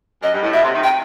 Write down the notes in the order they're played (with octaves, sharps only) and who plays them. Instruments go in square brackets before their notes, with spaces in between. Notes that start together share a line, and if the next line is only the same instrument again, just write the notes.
[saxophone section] F#2 [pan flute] D#5
[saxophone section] G2
A2
[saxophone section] B2 [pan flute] E5
[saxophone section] C3
D#3
[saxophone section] C3 [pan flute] G5